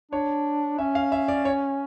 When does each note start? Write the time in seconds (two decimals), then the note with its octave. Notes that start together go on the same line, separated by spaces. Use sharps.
0.11 D4 C#5
0.78 C#4 E5
0.95 F5
1.12 E5
1.28 D5
1.45 C#5